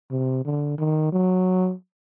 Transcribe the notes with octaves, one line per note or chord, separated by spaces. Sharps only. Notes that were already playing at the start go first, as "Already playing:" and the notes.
C3
D3
D#3
F#3